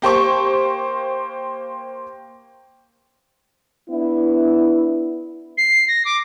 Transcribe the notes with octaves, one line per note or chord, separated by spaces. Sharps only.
A#3 G4 C5 C#6
B3 D4 E4
C7
A#6
D6